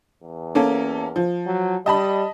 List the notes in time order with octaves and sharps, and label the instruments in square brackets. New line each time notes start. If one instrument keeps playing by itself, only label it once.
[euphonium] E2
[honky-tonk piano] A#3 C#4 A4
F3
[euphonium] F#3
[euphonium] G3 [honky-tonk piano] D#5 A5 B5